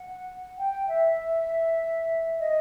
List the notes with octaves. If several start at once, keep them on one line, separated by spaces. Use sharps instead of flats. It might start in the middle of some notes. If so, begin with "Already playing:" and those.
Already playing: F#5
G5
E5
D#5